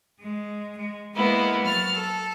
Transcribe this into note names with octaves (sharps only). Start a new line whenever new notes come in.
G#3
G#3
G#3 A#3 B3 E4
F#3 F6 A6
A4